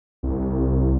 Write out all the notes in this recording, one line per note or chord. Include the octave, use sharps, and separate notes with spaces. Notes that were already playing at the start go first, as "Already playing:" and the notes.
C2